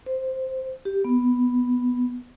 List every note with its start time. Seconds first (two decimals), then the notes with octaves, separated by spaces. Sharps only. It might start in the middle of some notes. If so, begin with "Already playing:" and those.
0.06 C5
0.85 G4
1.05 B3